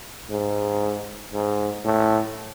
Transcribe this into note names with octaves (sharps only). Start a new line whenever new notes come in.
G#2
G#2
A2